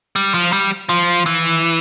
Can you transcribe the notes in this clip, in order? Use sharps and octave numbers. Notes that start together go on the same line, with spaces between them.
G3
F3
G3
F3
E3